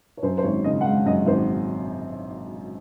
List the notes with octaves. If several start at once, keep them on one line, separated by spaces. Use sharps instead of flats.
C#5
F#2 C5
C5
G#1 C#5
C#3 D#5
F#5
G#3 F5
F#2 D#5
G#1 C5